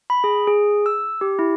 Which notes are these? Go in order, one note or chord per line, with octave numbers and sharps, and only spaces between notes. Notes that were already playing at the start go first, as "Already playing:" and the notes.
B5
G#4
G#4
E6
G4
E4